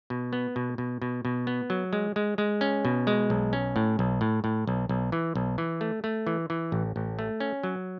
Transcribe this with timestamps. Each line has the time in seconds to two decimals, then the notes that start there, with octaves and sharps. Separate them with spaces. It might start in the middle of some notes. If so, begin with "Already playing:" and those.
0.10 B2
0.33 B3
0.56 B2
0.78 B2
1.02 B2
1.25 B2
1.47 B3
1.70 F#3
1.93 G#3
2.16 G#3
2.38 G#3
2.61 C#4
2.85 B2
3.07 G#3
3.30 B1
3.53 C#4
3.76 A2
3.99 B1
4.21 A2
4.44 A2
4.67 B1
4.89 B1
5.12 E3
5.35 B1
5.58 E3
5.81 A3
6.04 A3
6.27 E3
6.50 E3
6.72 A1
6.96 A1
7.19 A3
7.40 C#4
7.63 F#3